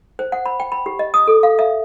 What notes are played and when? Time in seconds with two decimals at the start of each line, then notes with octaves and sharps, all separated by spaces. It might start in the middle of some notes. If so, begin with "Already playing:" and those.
0.19 C5
0.32 F#5
0.46 B5
0.60 G5
0.72 B5
0.86 G4
0.99 D#5
1.14 D#6
1.27 A4
1.43 F5
1.59 E5